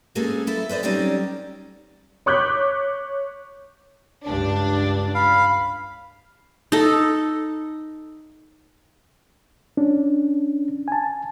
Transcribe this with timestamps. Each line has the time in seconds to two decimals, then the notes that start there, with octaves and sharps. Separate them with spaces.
0.15 G#3 A#3 C4 C#4 G#4 A4
0.47 B3 E4 A4
0.69 B4 C5 D5 D#5
0.83 F#3 G3 C4 C#4 D#4 D5
2.26 C#5 C#6 D6 F#6 G6 B6
4.26 C#2 G2 D4
5.15 F5 B5
6.72 D#4 A4
9.77 C#4 D4
10.88 G#5 A5